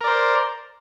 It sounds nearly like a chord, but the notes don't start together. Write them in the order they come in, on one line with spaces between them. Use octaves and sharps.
A#4 D5 C5